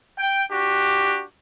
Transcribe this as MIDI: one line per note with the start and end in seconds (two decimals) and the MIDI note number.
0.18 0.42 79
0.50 1.22 62
0.50 1.22 66
0.50 1.22 67